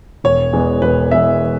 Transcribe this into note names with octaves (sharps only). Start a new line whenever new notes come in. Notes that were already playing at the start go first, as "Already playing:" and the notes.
E1 C#5
E2 E3 G#3 B3
E1 B4
E2 E3 G#3 B3 E5